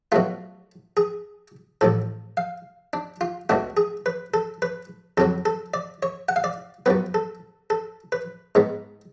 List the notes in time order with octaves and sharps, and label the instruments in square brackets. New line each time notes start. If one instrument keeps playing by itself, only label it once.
[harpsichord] B2 F#3 A3 F4
G#4
A1 A2 F3 A4
F5
D4
F4
C#2 B2 A3 D4 F#4
G#4
B4
A4
B4
F2 C#3 F#3 A4
A4
D5
C#5
F#5
F5
D5
F#2 F3 B3 B4
A4
A4
B4
G#2 G#3 B3